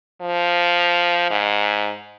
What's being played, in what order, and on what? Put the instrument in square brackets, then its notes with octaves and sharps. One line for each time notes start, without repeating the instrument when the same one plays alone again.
[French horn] F3
G#2